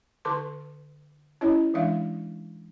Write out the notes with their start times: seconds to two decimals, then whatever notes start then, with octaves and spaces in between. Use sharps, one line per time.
0.25 D3 A4 B4 A5 C6 D6
1.41 C#4 E4 C#5 D#5
1.74 E3 G#3 D4 E5 F5